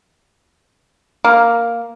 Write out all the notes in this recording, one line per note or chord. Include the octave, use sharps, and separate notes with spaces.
A#3